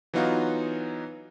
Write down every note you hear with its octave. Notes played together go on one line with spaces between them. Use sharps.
E3 F#3 B3 D#4 F4 F#4